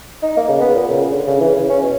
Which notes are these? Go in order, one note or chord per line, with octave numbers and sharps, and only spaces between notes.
D#4
A#3
C#3
B3
A#2
C#3
D3
C#3
E3
C#3
C#4
B2